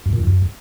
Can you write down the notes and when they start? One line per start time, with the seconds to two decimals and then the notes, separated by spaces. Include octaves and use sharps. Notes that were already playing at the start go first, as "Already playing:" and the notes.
0.06 F#2
0.13 A#2
0.20 F2
0.27 F#2